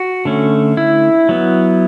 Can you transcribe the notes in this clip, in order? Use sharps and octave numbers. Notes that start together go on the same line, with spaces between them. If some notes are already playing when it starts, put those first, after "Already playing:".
Already playing: F#4
D3 A3 C#4
E4
F#3 B3